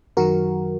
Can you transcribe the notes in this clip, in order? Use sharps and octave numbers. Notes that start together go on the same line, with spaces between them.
F#2 D#3 F#3 F#4 A#4